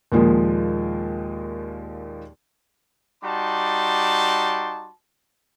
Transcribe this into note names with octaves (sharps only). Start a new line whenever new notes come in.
D#2 A#2 F3 G#3 A#3
G3 D#4 F#4 A5 C6 D6